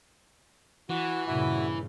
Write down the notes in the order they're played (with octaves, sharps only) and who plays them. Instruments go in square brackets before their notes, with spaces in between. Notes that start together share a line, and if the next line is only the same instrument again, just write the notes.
[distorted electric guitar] E3 [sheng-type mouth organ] F#4
[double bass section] G2 A#2 C#3 [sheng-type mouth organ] E4 F#4